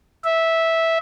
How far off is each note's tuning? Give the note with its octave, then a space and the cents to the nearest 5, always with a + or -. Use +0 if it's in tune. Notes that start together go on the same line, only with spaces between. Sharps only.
E5 -10